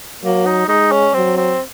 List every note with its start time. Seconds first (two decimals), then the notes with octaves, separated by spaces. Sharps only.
0.23 F#3 A#3
0.46 D#4
0.68 G#3 D#4
0.91 C#4
1.14 F#3 C4
1.37 C4